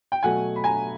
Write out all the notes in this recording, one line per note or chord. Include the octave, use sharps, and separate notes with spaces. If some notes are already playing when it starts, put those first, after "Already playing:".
G5
B2 F#3 A3 F#5 G#5
B5
G#5 A#5